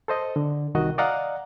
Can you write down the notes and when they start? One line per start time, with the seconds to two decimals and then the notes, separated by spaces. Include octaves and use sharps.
0.08 A4 C5 D#5
0.36 D3
0.75 C2 D#3 F#4 D#5
0.98 D5 D#5 F5 F#5 A#5